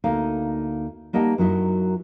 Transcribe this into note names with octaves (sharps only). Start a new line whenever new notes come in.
D2 A#3 D#4 F5
G3 A#3 D#4 D#5 F#5 A5
F#2 F#3 D#4 E4